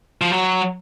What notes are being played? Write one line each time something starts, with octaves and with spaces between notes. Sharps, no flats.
F3
F#3